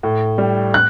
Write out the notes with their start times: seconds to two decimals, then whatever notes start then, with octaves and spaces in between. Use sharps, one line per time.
0.03 A2
0.38 G3
0.74 F#6